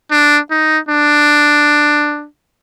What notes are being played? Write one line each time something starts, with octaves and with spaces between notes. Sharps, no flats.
D4
D#4
D4